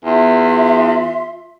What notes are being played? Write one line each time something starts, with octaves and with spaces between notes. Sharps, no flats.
E2 F4 E5 C6